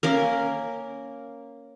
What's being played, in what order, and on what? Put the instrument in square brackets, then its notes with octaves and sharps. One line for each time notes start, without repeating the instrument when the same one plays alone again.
[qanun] A#3 C#4 A#4